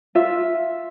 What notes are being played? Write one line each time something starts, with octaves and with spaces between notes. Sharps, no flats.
F4 E5